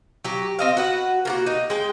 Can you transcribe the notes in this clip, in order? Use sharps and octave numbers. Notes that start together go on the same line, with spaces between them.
F#3 G4
C4 D#5 F5
F#4 B4 F#5
A#3 F4 F#4
D#4
G#3 G5